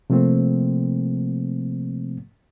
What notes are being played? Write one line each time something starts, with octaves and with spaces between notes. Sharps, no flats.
C3 F3 A3 A#3 C4